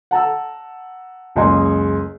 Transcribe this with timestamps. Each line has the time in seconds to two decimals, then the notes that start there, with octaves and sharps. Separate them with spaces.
0.11 F#5 A5 A#5 E6
1.35 F#1 C#2 G#3 D#5 G#5 C6